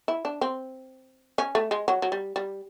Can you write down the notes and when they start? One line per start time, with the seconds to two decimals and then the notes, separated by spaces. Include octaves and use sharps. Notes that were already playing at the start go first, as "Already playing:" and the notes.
0.08 E4
0.25 D4
0.41 C4
1.38 C#4
1.55 A3
1.71 G#3
1.88 F#3
2.02 F#3
2.12 G3
2.36 G3